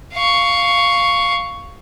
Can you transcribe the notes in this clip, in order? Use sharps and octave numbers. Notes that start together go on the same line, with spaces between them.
F5 C#6